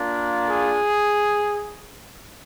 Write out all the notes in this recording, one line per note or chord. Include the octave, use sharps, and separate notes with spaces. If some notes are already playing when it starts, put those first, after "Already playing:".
Already playing: A#3 D4 F4
G#4